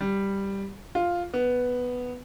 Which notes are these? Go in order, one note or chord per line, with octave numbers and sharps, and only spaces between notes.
G3
F4
B3